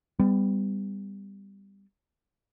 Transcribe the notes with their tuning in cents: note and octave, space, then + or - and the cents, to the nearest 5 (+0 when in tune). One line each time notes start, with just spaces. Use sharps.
G3 +15 B3 +35